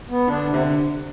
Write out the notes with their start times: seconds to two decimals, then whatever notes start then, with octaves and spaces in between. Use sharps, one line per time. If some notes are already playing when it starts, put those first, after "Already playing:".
0.09 B3
0.28 D3 D4
0.47 C3
0.54 D3